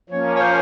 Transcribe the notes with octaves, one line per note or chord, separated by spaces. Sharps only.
F3 A#3 C#4 C#5
C#5
C5